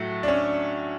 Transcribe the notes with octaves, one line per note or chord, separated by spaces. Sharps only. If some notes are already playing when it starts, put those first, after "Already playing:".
Already playing: A2 F#3 A3 F#4
D4
C#4